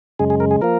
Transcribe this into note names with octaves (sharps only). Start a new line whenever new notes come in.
F#2 C#3 G#3 G#4
G#4
A#4
G#4
F3 A#3 A#4